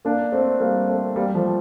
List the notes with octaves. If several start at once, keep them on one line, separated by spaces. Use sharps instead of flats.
A#3 D4
A3 C4
G3 A#3
A3 C4
G3 A#3
F3 A3